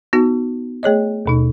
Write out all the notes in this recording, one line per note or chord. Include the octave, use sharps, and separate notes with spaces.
B3 D#4 F#4
A3 G#4 C#5 D#5
D#2 B2 D#4